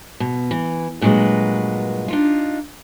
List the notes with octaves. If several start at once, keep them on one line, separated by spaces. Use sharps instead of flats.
B2
E3
G2 A#2 F#3 G#3 F#4 B4
D4 D#4 F4